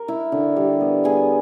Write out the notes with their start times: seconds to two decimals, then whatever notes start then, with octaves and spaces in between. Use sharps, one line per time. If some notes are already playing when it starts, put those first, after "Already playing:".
Already playing: A#4
0.08 E4
0.32 D3
0.56 G3
0.81 B3
1.04 B3 G#4